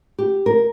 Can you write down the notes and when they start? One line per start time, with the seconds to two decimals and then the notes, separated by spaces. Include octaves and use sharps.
0.19 G4
0.46 A#4